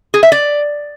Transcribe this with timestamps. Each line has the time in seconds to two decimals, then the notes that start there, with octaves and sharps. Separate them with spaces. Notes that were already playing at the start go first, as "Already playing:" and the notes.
0.14 G#4
0.23 E5
0.32 D5